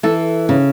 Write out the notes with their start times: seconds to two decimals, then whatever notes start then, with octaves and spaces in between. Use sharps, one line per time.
0.03 E3 A4
0.49 C#3